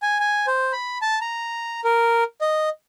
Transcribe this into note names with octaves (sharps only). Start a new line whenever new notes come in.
G#5
G#5
C5
B5
A5
A#5
A#4
D#5